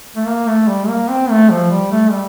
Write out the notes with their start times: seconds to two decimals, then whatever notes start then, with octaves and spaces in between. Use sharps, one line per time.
0.16 A3
0.26 A#3
0.47 A3
0.68 G3
0.88 A#3
1.09 C4
1.30 A3
1.50 F3
1.70 G3
1.91 A3
2.11 G3